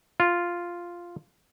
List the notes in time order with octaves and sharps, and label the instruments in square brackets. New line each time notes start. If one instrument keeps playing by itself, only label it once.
[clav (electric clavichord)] F4